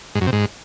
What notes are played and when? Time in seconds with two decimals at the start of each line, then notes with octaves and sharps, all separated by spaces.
0.15 G#2
0.21 F#2
0.27 C3
0.33 G#2